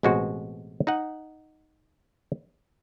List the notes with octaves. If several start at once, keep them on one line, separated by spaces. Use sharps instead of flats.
A1 B2 G#3 C4 F#4 C5
D#4 D#5 F#5